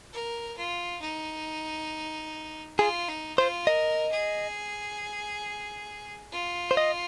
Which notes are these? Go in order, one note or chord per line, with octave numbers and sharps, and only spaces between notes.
A#4
F4
D#4
F4 G#4
D#4
F4 C5
A#4 D#5
G#4
F4
C5
D#5